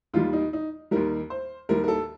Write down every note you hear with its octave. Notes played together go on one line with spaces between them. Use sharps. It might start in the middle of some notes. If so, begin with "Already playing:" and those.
D#2 D#3 G3 F4
D#4
D#4
D#2 D#3 G3 A#4
C5
D#2 D#3 G3 A#4
A#4
A4